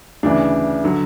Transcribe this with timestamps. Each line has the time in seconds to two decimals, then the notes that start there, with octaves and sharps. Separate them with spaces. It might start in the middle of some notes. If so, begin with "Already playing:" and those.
0.23 D2 C#3 E3 D4
0.84 D3 F#3